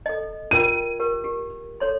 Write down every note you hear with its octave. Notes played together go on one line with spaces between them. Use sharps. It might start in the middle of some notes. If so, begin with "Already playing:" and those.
A4 D#5
F4 A#4 G5 D#7
G4 A#4
G4
A4 C#5 C6